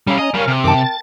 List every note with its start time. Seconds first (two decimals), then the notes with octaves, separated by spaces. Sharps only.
0.07 G3 C#4 E4 F5 A#5
0.19 D#5 G#5 A#5
0.34 G3 C#4 A#4 F5
0.47 C3
0.64 F#2 D#3 A#4 G5 A5 D6
0.78 A6